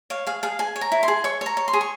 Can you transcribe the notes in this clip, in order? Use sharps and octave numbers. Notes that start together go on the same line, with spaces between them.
C#5 F5
G#4 F5
G#4 F5
G#4 G#5
C#5
A#5
E4
C6
G#4
C#5 C#6
C#5 A#5
C#5
C6
G#4
C#6